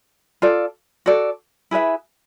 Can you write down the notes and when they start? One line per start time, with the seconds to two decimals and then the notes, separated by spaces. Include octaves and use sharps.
0.42 F4 A4 D5
1.06 F#4 A4 D5
1.71 E4 G#4 B4 E5